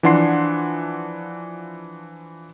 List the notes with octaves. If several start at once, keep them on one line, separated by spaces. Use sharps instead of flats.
E3 F3 D4 F#5 C6 C7